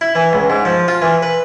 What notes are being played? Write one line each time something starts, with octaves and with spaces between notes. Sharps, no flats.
E4
E3
C#2
G#2
F3
F4
E3
B4